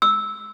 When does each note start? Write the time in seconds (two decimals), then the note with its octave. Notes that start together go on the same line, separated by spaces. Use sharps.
0.02 E6